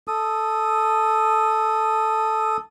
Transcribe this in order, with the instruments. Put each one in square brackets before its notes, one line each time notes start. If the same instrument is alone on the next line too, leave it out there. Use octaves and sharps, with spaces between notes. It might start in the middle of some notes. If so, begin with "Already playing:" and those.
[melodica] A4 D#6